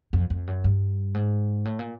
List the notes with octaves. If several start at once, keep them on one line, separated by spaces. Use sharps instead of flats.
F2
F2
F#2
G2
G#2
A2
A#2